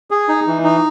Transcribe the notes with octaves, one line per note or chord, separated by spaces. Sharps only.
G#4
D#4
E3
D#4